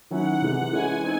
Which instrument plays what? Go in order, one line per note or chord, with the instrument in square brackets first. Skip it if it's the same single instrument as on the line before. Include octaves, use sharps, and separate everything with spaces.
[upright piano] D#3 F#3 C#4 E4 [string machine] F#5
[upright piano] C3 E3 G#3
[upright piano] E3 G#3 C#4 E4 [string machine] G#5
[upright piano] C4 D#4